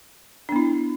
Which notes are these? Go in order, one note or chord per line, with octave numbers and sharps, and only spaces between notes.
B3 D4 E4